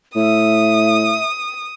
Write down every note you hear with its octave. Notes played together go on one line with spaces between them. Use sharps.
A2 E5 D#6